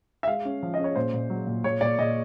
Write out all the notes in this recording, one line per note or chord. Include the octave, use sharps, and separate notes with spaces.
E5
G#3 F5
C#4
F3
D#5
C#4 C#5
A#2 C5
A#2
F#3
A#2
A#2 C#5
A#2 D5
A#2 D#5